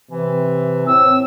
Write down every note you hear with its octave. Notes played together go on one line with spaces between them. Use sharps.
C3 E3
A2 C4 E6